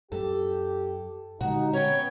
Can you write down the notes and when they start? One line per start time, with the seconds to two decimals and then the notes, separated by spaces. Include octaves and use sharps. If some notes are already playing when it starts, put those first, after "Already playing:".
0.12 F#2 G4 A4
1.41 D#2 A#2 D3 G#3 D#4 F#4
1.73 B3 C#4 C#5 G5